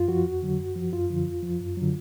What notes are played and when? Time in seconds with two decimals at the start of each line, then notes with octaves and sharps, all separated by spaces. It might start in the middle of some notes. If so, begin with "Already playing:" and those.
Already playing: F#2 F4
0.08 F3 F#4
0.26 F2
0.43 D3 F#3
0.59 F#2
0.76 F3
0.93 F#2 F4
1.10 D3 F3
1.27 F2
1.43 F3
1.60 F#2
1.77 D3 F#3